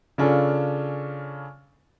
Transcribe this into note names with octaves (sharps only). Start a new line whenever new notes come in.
C#3 C#4 D4 F4 A4